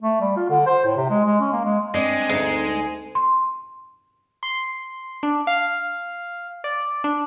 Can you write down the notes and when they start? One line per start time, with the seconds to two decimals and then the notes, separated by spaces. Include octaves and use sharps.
0.02 A3
0.20 G3
0.36 F4
0.50 D3
0.66 C5
0.85 A2
0.97 C3
1.10 G#3
1.25 G#3
1.40 C#4
1.53 A#3
1.65 G#3
1.94 G#3 C4 D4 D#5
2.29 D2 D#4 G#4
3.15 C6
4.43 C6
5.23 D4
5.47 F5
6.64 D5
7.04 D4